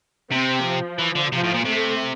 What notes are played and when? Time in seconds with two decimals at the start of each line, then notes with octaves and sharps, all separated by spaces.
0.32 C3 C4
0.65 F3
0.99 E3
1.16 D3
1.32 C3 F3
1.44 A2
1.54 A#2
1.65 C3 A3